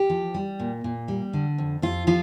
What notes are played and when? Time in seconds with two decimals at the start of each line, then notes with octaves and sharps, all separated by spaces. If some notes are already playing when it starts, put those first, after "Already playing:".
Already playing: G4
0.10 F3
0.34 G3
0.60 A#2
0.84 A#2
1.08 G3
1.33 D3
1.58 F2
1.82 F2 F4
2.07 F3 F4